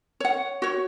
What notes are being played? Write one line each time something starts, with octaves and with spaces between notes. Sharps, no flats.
C#5 F#5
F#4 C#5